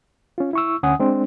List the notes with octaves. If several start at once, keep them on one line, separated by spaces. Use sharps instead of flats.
C#4 F4
E4 C#6 E6
D2 D3 C#4 F#5 G#5 D#6
G#3 C4 D4